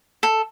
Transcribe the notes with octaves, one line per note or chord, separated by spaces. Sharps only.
A4